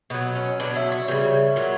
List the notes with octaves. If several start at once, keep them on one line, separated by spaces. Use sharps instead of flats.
B2 F#3 B3
C#4
B2 F#3 D4
E4
C#5
C#3 E3 G3
A#2 F#3